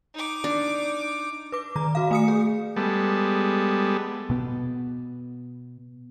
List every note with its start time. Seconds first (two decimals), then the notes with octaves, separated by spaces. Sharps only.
0.14 D#4 D6
0.44 D4
1.52 B4 D6
1.76 D#3 A#5
1.95 F#4 F5
2.11 A3 D#6 C#7
2.28 G#4
2.76 G3 G#3 B3 A4
4.30 B2 B3